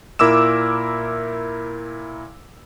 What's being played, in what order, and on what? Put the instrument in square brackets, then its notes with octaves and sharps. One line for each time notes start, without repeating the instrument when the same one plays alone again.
[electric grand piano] A#2 E4 A#4 D6 E6 E7